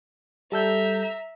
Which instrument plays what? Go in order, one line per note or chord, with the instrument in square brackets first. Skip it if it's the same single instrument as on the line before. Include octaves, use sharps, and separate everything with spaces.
[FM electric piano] G3 A4 G6 [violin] E5 A#5